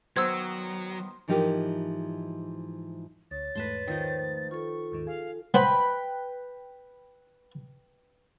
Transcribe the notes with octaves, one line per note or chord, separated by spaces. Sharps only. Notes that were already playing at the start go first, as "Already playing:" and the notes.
D#3 F#3 B3 C5 E6 G#6
G#2 E3 F3 D#4 G4 A#4
D2 C#5 A6
E2 G#2 A3 B4 A5 C6
D#3 F3 D#4
F4 A4 C#6
D#2 G#2 D#3
G#4 F5
B3 B4 C5 G5 B5